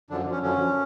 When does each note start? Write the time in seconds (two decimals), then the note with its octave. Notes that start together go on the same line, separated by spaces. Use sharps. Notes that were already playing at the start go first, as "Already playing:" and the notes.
0.10 F#2 D3 F3 D4
0.31 C#4
0.42 F#2 D3 F3 C#4